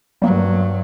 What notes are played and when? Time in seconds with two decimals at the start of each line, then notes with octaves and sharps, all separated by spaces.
0.22 G2 F#3 G3 A#3